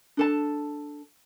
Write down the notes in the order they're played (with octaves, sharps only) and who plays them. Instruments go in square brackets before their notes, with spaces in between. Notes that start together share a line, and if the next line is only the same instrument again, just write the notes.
[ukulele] D4 A4 A5